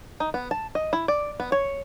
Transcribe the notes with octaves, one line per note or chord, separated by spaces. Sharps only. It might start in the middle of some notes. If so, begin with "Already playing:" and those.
D#4
B3
A5
D#5
E4
D5
B3
C#5